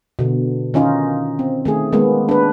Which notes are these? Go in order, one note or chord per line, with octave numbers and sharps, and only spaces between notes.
B2 D3
D#3 C#4 D#4 F4
C4
D#3 A3 G#4
D#3 G#3 A#3 B3
D4 B4